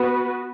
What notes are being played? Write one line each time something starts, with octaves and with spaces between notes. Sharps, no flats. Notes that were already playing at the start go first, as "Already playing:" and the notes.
Already playing: B3 F#4 B4